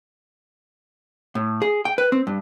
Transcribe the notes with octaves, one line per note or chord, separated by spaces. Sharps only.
A2
G#4
G5
B4
C4
G2